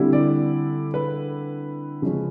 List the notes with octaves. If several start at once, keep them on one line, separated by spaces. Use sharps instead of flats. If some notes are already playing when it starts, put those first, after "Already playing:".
Already playing: D3 G3 C4 E4
D5
B4
C#3 F3 G#3 C#4